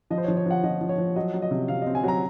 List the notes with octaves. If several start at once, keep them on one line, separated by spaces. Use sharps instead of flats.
F3 D#5
C5
C#5
F3
C#5
F3 F#5
F3 D#5
F3
C#5
F3
F#3 D#5
F#3
D#5
C3
C3 F5
C4 D#5
G#5
F#3 A#5